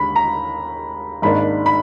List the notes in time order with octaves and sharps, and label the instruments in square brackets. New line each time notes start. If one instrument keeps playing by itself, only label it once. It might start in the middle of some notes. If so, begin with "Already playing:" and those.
Already playing: [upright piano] D#2 D3 G#3 B5
A#5
G#1 G#2 D#3 A#3 D4 B5
B5